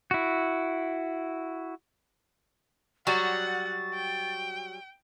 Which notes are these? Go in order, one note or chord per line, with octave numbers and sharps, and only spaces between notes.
E4 F#4
F#3 G3 F#4 F#5 A6
G5